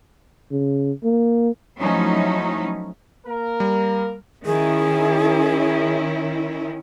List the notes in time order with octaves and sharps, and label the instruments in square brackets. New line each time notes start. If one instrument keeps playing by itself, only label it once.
[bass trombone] C#3
A#3
[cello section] F3 F#3 A3 C#4 D#4 E4
[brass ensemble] A#3 A#4
[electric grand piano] G3
[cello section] D#3 C#4 E4 [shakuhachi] G#4